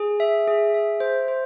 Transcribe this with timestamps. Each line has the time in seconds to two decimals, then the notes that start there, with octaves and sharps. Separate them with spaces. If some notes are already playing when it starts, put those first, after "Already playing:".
Already playing: G#4
0.20 E5
0.48 G#4
0.74 E5
1.00 C5
1.28 C5